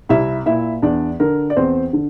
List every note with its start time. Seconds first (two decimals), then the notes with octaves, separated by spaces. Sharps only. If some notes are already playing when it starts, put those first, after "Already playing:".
0.09 C2 E4 E5
0.46 A#2 E4 E5
0.82 E2 D4 D5
1.20 D3 A#4
1.50 D5
1.56 E2 C4 C5
1.93 D3